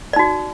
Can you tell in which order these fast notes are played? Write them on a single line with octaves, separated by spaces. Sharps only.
D5 D#4 F#4